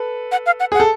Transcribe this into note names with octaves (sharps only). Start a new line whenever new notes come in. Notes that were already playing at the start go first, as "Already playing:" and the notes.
Already playing: A4 B4
F#5
F5
F#5
G#4 F#5
A4